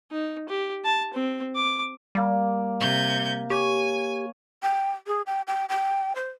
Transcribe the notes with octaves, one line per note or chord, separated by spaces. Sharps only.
D#4
G4
A5
C4
D6
G3 A#3 D6
C3 G6 G#6
G4 C#5 G#5
G5
G#4
G5
G5
G5
C5